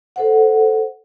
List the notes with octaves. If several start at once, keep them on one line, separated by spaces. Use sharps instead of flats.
A4 C5 F#5